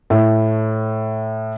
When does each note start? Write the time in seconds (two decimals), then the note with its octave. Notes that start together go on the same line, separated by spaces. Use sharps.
0.10 A2